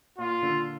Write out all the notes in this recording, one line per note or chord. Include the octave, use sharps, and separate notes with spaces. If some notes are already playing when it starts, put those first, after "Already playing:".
A#2 F4
A#2 D3